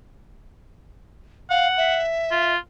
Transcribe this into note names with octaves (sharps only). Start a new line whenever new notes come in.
F5 F#5
E5
F4